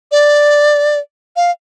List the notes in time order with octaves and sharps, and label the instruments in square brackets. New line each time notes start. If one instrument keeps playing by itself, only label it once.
[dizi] D5
F5